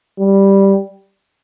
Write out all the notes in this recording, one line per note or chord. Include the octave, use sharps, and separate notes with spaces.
G3